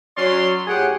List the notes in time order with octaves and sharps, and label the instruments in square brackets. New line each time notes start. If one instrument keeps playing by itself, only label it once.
[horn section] F#3 C#4 D5 C6
A2 G4 G#4 F#5